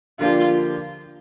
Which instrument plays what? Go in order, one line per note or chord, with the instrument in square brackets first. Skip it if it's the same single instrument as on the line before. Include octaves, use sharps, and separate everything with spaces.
[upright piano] D3 F3 A#3 D4 G4 [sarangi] F4